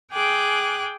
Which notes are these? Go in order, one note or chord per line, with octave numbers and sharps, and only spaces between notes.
G#4 G5 D6 F#6